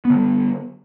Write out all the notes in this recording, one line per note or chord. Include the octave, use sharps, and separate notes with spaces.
D3 G3 B3